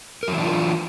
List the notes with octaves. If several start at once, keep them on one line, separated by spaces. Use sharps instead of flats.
E3 F#3 D4 F4 A#4